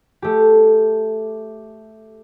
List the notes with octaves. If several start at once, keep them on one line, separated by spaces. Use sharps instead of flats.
A3 G4